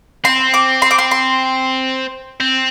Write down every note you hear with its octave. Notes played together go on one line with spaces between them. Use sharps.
C4 C6
D6
C6
D6
C6
C6
C4